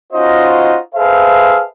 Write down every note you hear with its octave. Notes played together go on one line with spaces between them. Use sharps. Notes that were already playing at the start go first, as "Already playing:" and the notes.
C#4 D#4 F4 F#4 C5 D#5
G#4 A4 B4 C5 E5 F5